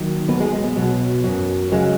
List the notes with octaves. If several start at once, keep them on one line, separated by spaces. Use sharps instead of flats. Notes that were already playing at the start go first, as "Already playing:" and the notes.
Already playing: D#2 D#3 F#3
B1 B2 F#3 B3 B4
G#3 G#4
G#3
B3
B1 B2 F#3
F#2 F#3
C#3 F#3 G#3